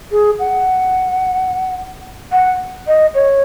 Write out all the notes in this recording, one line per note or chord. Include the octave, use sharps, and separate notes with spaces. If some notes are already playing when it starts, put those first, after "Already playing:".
G#4
F#5
F#5
D#5
C#5